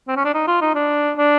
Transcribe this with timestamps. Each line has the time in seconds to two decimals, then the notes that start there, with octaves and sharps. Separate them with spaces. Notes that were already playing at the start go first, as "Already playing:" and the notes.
0.08 C4
0.17 C#4
0.25 D4
0.34 D#4
0.47 F4
0.61 D#4
0.75 D4
1.17 D4